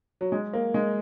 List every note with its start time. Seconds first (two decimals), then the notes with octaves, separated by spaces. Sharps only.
0.21 F#3
0.32 G#3
0.53 A#3
0.74 G#3